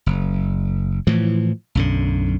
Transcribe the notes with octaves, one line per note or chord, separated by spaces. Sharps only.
F#1
A2 E3 F3
B1 F#2 D3